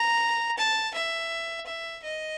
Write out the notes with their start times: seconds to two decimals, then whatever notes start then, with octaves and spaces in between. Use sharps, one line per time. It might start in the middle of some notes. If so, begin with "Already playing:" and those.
Already playing: A#5
0.58 A5
0.94 E5
1.66 E5
2.03 D#5